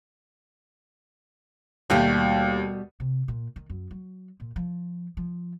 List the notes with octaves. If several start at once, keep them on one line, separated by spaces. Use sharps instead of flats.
D#2 B2 G3 A3
C3
A#2
D#3
F#2
F#3
A#2
F3
F3